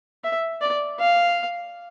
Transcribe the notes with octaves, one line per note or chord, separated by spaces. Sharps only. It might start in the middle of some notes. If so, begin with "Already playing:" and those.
E5
D5
F5